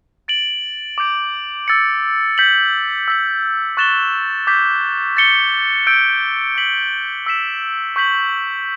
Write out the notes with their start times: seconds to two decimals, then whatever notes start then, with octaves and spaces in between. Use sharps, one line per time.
0.28 A6 D7 F#7
0.98 D6 G6 D7
1.68 E6 A6 C#7
2.38 G6 B6 F#7
3.08 E6 B6 F#7
3.77 C#6 F#6 A6 E7 G7
4.47 D6 G6 B6
5.17 A6 C#7 G7
5.87 E6 G6 D7
6.56 E6 B6 F#7
7.26 E6 B6 E7
7.96 C#6 G6 B6 F#7